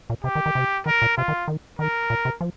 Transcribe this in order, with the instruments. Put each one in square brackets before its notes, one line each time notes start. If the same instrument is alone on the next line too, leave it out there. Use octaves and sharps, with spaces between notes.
[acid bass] A#2
[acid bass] C3 [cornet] G4
[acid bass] D#3
D#3
C3
[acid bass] D#3 [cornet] A#4
[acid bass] A#2
[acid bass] C3 [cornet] F4
[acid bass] D#3
D#3
[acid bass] D#3 [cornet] A#4
[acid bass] A#2
C3
F3